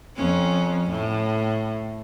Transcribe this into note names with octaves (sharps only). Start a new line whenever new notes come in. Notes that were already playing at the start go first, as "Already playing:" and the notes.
F2 C#4
A2